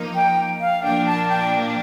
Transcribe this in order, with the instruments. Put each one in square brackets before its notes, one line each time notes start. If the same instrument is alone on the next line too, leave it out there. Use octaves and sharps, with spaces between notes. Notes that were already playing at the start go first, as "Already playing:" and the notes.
Already playing: [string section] F3 A#3 D#4
[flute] G5
F5
[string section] A#2 F3 A#3 D4 [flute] G5
[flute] A5
G5